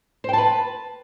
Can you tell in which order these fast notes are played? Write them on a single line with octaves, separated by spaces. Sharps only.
C5 G5 A5 B4